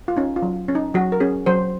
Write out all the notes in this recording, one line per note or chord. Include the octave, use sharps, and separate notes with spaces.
F4
C#4 D#4
F4
F#3
C#4
D#4
F#3 F#4
A#4
C#4 G#4
F#3 C5